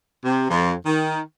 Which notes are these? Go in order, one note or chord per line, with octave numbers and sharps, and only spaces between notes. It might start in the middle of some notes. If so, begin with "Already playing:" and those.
C3
F2
D#3